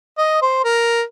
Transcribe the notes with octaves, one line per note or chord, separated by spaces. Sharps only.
D#5
C5
A#4